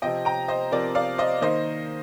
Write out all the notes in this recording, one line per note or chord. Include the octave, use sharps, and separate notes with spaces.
C3 F3 C4 D#5 G5
G5 A#5
C5 D#5
C3 F3 C4 A#4 D5
D5 F5
C5 D#5
D#3 A#3 C5 D#5